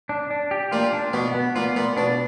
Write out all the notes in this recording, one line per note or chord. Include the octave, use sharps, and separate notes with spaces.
D4
D4
G4
A#2 F4
D4
B2 B3
B3
A#2 F4
A#2 B3
B2 D4